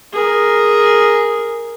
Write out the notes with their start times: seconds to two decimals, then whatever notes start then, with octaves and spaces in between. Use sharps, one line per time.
0.13 G#4 A#4